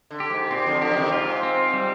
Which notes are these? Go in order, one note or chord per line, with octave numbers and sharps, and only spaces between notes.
D3
G4
G#2
A#2 C4
D3 F3
D3 F3 G4
C3 D#3
G#2 F4
C4
G3